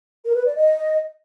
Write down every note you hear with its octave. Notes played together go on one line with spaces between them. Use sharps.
A#4
B4
D5
D#5